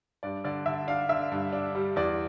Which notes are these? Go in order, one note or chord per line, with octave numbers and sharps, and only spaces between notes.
G2 D5
D3 D5
D3 E5
D4 F5
D3 E5
G2
D4
G3
E2 D5